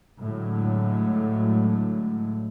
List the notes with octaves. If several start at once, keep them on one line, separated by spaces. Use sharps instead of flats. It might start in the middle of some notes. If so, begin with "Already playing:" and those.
A2 D3 F#3 G#3 A3